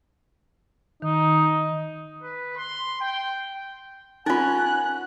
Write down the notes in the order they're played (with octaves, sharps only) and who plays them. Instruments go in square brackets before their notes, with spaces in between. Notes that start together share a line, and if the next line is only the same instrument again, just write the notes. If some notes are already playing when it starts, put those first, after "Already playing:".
[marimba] D#3 [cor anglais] D#4
[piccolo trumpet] B4
C6
G5
[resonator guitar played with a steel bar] C#4 A#4 [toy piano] D#4 F4 [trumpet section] F#5 G#5 [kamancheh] F#6